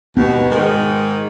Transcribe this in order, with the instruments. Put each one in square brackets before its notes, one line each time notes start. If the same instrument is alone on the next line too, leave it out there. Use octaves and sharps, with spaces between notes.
[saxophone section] D#2 B2 [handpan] B3
[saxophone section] G#2 D#3